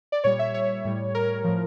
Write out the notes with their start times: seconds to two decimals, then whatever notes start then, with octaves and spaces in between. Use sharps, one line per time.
0.12 D5
0.24 A#2 G3 C#5
0.39 E5
0.54 C#5
0.85 A2 G3
1.15 A#4
1.44 A2 F3